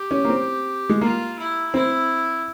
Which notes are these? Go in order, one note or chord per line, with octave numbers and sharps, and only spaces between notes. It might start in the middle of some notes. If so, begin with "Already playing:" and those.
Already playing: G4
C#4
A#3
C4
G#3
A#3 F4
E4
C4 E4